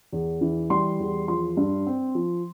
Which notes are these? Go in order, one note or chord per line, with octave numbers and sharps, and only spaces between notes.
E2
E3
G3 C6
E2
F3 C6
G2
C4
F3